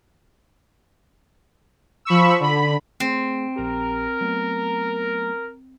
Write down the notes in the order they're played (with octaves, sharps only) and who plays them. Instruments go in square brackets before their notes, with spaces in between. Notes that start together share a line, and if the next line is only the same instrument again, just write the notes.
[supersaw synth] F3 B5 C#6 E6
D3 B5
[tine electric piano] A3 G#4 [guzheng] C4
[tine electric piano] A#1 G4 [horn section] A#4
[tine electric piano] F#3 A3 B3